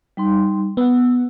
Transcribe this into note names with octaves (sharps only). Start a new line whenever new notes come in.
G3 D#4 C6
B3 F#5 E6